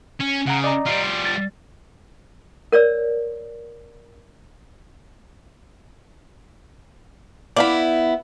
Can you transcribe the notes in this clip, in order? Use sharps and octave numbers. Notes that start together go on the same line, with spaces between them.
C#4
C#3 F#5 A#5
D5 D#5 A#5
G3 F4
A6
A#4 C#5 D5 E6
B3 E4 D5 F5 B5